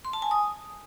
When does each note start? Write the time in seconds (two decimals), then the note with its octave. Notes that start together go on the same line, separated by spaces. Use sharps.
0.05 C6
0.13 A5
0.22 G#5
0.31 D#6